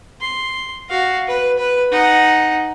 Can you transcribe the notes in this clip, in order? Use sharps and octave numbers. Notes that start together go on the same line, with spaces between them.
C6
F#4 F5
B4
B4
D#4 F#5